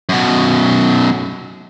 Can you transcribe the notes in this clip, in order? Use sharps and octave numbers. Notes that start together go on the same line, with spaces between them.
F#2 B2